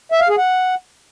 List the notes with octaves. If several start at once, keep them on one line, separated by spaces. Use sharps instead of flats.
E5
F5
G#4
F#5